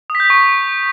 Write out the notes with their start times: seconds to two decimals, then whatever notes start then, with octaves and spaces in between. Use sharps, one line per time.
0.10 D#6
0.15 B6
0.20 G6
0.25 B6
0.30 C#6